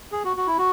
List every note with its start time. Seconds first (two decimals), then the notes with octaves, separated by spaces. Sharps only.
0.12 G#4
0.25 F#4
0.37 F#4
0.47 E4
0.58 F#4